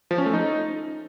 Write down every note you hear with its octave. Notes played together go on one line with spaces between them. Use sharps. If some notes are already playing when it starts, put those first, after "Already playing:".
F3
C#4
A3
D#4